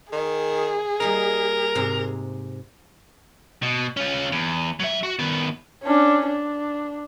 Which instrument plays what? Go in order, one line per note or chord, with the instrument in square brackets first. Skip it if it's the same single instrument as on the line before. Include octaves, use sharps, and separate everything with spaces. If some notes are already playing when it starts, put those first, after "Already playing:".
[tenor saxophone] D#3 [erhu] G#4
[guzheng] G3 A#3 D#4 [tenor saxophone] A#4
[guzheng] G#2 C3
[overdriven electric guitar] B2
C#4 F4
E2
F#3 E5
F#4
D#3 B3
[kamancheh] C#4 D4
D4